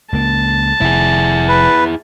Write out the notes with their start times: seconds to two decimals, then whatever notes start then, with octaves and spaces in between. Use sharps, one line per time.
0.13 C#2 A#3 A5
0.81 F1 E4 G#4
1.48 B4